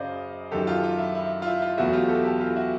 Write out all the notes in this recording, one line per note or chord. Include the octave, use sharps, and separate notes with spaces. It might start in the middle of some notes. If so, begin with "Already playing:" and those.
Already playing: F#2 C#3 F#3 C5 D5 D#5 F5
F#2 D#3 F#3 G4 A4
F4 G4
F4
E4
E4
F4
E4
F4
E2 B2 F#3 A3 E4 F#4
F4 G4
G4 A4
G4 A4
F4 G4
E4 F#4